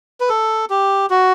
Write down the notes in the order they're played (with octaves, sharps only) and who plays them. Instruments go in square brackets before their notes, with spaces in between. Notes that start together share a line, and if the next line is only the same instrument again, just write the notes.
[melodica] B4
A4
G4
F#4